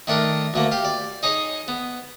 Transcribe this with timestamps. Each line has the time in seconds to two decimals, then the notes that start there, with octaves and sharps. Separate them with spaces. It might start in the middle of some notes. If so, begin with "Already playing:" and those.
0.07 D#3 A3 D4 A#4
0.54 D2 A3 A#3
0.71 G4 F5
0.85 D5
1.23 D#4 G#4 C#5 D#5
1.68 B3